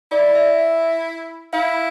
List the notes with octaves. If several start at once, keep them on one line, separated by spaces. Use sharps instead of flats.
E4 D5
E5
E5
E4 F5